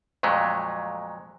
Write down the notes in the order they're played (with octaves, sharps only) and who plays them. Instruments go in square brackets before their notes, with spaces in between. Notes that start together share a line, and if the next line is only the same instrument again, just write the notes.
[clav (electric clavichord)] F2 A#2 F#3 G#3 A3